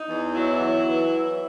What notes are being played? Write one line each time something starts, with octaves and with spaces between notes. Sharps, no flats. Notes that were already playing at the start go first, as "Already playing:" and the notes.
Already playing: D#4
E2
F#3 E4
F#3
E3